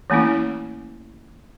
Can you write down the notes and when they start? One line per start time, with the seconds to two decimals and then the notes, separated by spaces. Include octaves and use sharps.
0.10 E3 A3 A#3 C#4 E4